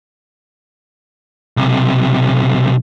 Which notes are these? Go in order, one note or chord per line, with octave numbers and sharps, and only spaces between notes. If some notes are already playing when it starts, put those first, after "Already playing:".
B1 C3